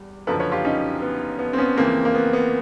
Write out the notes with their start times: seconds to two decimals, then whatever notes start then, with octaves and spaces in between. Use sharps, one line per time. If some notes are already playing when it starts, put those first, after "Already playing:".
Already playing: E2 G3
0.27 F#1 F#2 D3 F3 A4 B4
0.40 B4 C#5
0.52 F4 G4
0.64 C#4 D#4
1.02 B3
1.39 B3
1.53 C4
1.58 B3 C#4
1.77 F2 C#3 E3 A#3 C4
2.05 A#3
2.14 B3
2.33 B3